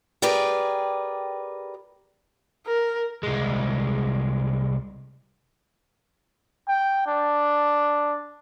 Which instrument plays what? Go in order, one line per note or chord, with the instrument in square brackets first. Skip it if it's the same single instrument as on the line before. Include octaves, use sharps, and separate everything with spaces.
[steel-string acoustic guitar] G4 G#4 A#4 B4 D5 G5
[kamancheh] A#4
[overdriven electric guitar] C2 G#3
[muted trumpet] G5
D4